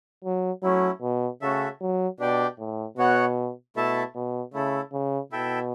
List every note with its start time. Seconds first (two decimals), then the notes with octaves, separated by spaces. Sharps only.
0.24 F#3
0.63 F#3 A3 C#4 E4
1.02 B2
1.41 C#3 A3 C#4 F#4 A4 E5
1.81 F#3
2.19 B2 D4 G4 D5 G5
2.59 A2
2.97 B2 B3 F#4 C#5 F#5
3.76 B2 A3 E4 A4 E5 A5
4.15 B2
4.53 C#3 A3 E4 A4
4.92 C#3
5.32 B2 E4 A4 E5 G5